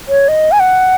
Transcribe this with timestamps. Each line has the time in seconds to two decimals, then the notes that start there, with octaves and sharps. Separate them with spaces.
0.08 C#5
0.28 D#5
0.52 G#5
0.60 F#5